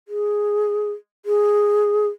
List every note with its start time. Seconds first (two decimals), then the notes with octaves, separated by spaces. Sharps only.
0.08 G#4
1.26 G#4